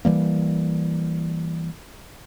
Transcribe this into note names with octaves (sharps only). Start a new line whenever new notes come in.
E3 G3 A#3